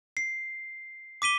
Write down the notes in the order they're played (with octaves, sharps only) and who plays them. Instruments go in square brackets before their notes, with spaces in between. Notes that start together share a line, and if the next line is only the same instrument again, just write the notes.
[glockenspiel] C7
D6 B6 D#7 G7